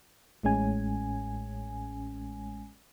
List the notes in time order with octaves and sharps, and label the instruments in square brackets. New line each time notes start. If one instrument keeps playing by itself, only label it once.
[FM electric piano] A1 A2 G#3 C#4 G#5